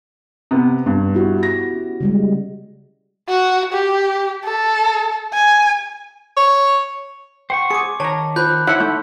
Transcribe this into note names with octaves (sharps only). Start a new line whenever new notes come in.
C3 B3
G2 B3
E4 F#4 G4
A#6
C#4
C#3 G3 G#3
F#4
G4
A4
G#5
C#5
C5 F#5 G5 C#6
G#4 D6 C#7
D#3 C#5 A5 A#5
F4 C5 B5 F#6 G6
D#4 E4 C#5 E5 F#5 C6 F#6
A3 G6